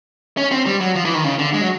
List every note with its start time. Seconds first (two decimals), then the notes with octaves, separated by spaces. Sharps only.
0.37 C#4
0.51 C4
0.66 G3
0.80 F#3
0.95 F3
1.05 E3
1.14 D#3
1.24 C#3
1.39 D3
1.54 G#3
1.61 F#3